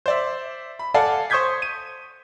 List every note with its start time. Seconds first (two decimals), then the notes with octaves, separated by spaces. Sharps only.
0.06 C5 D5 E5
0.79 B5
0.94 A4 D5 F5 F#5 G#5 A5
1.30 C5 C#6 D#6 G6 G#6 B6
1.62 D#7